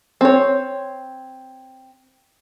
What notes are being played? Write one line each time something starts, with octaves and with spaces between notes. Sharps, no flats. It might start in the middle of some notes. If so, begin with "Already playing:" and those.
C4 C#5